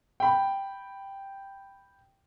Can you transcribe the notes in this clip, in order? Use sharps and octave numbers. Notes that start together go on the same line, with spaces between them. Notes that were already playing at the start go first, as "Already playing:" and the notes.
G5 B5